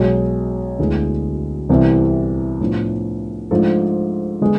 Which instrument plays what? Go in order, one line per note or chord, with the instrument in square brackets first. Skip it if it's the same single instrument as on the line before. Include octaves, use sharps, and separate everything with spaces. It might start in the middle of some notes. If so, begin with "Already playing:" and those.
Already playing: [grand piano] B1 B2 G#3
D2 D3 G#3 B3 E4
C2 C3 E3 B3
A2 F3 B3 D4
G#2 F3 A3 D4 A4
D3 G#3 B3